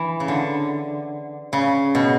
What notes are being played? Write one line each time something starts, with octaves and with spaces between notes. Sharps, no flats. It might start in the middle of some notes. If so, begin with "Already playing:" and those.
Already playing: E3
C#3
D3
C#3
B2